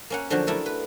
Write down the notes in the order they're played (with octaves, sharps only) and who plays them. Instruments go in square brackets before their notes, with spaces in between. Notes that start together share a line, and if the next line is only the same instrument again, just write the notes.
[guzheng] A#3 C#4 F#5
D3 F3 F#3 D4 F#4
A3 D4 E4 A4 A#4
B4